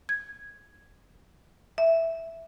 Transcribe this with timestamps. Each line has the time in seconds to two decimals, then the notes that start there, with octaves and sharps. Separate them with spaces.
0.09 G#6
1.78 E5